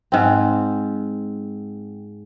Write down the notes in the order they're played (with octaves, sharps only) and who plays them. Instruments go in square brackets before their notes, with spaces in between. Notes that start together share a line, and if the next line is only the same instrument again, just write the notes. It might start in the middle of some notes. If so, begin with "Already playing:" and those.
[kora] G#2 C4